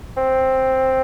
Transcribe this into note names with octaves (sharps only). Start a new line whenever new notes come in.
C4